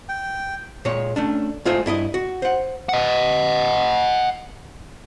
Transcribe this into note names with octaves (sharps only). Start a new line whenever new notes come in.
G5
A#2 G#3 C#5
A3 C#4 D4
G#3 A3 F4 G#4 C5 E5
G2 E4 G4 D#5
F#4
C5 F#5
D#5 F#5